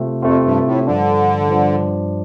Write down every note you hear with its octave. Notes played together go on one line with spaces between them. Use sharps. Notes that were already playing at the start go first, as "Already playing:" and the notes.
Already playing: C3 A3 C4 F4
F2 C3 A3 C4 F4
G2
A2
G2 D3 F3 D4
G2 F3 D4